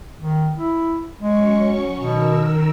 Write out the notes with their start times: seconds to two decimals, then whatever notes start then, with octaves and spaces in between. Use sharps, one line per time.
0.19 D#3
0.56 E4
1.21 F#3 G#3 C#4 C#6
1.98 B2 D#3 A#4 E6